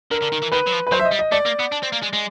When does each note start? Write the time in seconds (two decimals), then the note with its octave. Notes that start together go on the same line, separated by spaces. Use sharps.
0.11 D3 A#4
0.22 D3
0.32 D#3
0.42 E3
0.52 D#3 B4
0.67 F#3
0.72 F3
0.87 B4
0.92 F#3 C5
0.99 E5
1.05 D#5
1.12 G3
1.19 D#5
1.32 A3 D5
1.46 A#3
1.59 B3
1.72 D4
1.83 C4
1.92 A#3
2.03 G#3
2.13 G#3